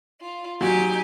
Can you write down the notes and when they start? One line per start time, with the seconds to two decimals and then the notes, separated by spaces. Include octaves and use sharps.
0.21 F4
0.61 F#3 D#4 G4 G#5